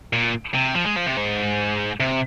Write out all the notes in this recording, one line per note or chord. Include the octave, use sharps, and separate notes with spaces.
A#2
C3
F3
G#3
F3
C3
G#2
C3